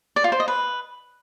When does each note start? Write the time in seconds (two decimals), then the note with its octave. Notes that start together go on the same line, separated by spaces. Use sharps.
0.16 D5
0.24 F4
0.32 C5
0.40 D#5
0.48 B4